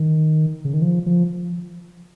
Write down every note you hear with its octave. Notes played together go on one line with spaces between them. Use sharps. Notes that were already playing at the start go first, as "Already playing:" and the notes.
Already playing: D#3
C#3
D#3
F3
F3